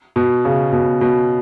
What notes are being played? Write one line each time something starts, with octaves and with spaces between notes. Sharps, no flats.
B2
C#3
B2
B2